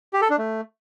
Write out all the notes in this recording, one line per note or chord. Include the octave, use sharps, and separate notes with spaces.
G4
A4
D4
A3